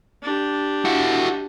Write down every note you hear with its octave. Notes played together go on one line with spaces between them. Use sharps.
D4 G4
E4 F#4